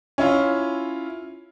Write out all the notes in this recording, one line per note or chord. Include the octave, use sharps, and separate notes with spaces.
C#4 E4 F4